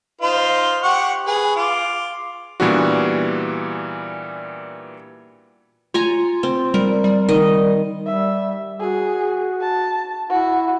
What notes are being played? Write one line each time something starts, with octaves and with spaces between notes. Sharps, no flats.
D#4 F4 C5
G4 F#5 C#6
G#4 B4
F4 D6
A#2 E3 G3 B3 D4 F#4
F4 C#5 G#5 A#5
C4
G3 A#4
G3
D#3 D#5
G3 E5
F#4 G#4
A5
E4 F#4